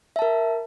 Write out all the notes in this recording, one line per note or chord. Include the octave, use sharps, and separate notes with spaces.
A#4 E5 A5